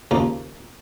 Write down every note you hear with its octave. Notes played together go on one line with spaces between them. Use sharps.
D#2 C#3 F3 A#3 D#4